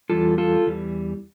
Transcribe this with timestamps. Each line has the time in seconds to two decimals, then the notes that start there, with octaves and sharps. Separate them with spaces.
0.10 E2 E3 G3 F4 A4
0.38 F4 A4
0.67 E2 E3 G3